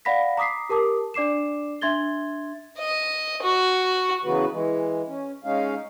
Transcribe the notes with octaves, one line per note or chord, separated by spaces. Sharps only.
D5 F5 F#5 B5 A#6 B6
A#5 D6 D#6 B6 C7
G4 A#4 A5 D6 D#6
D4 D5 D6 C7 E7
D4 E5 C6 G#6 A6 G7
D#5
F#4
C#3 E3 F#3 B3 F#4 B4
E3 G#3
C#4
G#3 C#4 D#4 F5